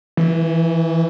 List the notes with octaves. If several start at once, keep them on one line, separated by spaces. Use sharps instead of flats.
E3